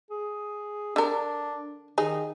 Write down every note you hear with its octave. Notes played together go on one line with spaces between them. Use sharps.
G#4
D3 D4 A#4
D#3 D#4 G#4